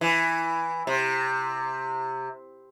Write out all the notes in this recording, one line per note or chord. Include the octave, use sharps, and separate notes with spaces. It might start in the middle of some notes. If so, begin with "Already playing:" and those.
E3
C3